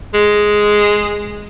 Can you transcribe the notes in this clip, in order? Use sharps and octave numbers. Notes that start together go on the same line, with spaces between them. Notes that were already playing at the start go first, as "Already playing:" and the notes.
G#3